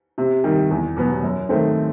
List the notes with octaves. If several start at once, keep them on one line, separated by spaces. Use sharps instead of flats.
C3
D#3 G3
E2
B2 F#3 B3
F#2
D#3 A3 C4